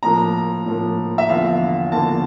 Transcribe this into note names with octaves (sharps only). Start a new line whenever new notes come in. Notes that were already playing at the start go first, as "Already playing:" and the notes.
A2 F3 A#3 A#5
A2 F3 A#3
E5
E2 D3 F3 A#3 F5
E2 D3 F3 A#3 A5